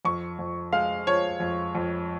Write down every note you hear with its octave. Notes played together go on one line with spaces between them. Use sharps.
F2 C#6
F2
G#3 F5
F3 C#5
F2
F2